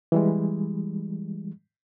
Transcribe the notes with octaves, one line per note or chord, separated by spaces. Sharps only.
E3 G3 G#3